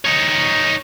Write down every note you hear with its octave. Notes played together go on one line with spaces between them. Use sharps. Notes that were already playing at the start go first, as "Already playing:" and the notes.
D#4 C#5